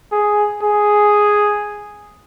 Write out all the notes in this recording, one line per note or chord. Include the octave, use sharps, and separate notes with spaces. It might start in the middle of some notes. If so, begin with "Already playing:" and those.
G#4
G#4